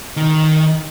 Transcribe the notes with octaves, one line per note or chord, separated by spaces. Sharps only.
D#3